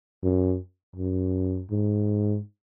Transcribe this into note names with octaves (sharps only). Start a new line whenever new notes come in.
F#2
F#2
G#2